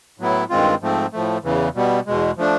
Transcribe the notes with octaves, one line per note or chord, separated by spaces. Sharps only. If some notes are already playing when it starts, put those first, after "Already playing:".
A2 F#3 B3 E4
G2 D#3 G#3 C4 F4
G#2 F3 A3 C4
A2 F3 A3
E2 C#3 E3
B2 G3 B3
E2 B2 G#3
F3 A3 D4